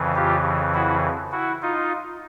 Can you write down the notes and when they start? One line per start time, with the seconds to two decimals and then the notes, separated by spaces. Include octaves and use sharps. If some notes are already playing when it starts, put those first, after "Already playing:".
Already playing: F2 C#3 E3
0.15 F4 G4
0.74 E4 F#4
1.32 E4 F#4
1.62 D#4 F4